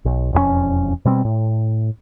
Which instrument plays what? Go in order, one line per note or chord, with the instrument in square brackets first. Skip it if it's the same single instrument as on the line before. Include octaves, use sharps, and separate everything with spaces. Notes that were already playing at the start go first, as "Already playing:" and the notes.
[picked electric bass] B1
E1 F2 E3 C#4
B2 G3 C4
A2